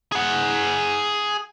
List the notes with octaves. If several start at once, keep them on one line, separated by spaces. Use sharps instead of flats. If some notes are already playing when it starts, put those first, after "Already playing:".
G#4 F#5